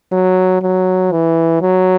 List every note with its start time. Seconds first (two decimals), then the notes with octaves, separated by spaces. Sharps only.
0.12 F#3
0.62 F#3
1.12 E3
1.61 F#3